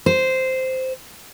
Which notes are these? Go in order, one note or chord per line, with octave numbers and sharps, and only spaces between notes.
C5